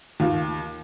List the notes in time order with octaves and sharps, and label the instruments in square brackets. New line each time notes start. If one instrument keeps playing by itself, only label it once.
[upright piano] D#2 F4